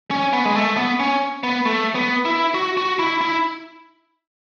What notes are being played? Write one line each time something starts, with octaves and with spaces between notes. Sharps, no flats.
C#4
B3
G#3
A3
B3
C#4
B3
A3
B3
E4
F#4
F#4
E4
E4